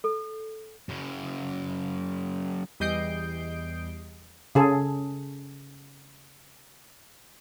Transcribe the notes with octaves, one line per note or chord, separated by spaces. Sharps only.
A4
F#2 C#3
E2 G3 D#5 G6 C7 D7
C#3 G#4 A4